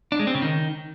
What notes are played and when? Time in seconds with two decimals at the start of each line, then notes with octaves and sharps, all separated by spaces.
0.12 D4
0.19 G#3
0.27 C4
0.35 C#3
0.42 D#3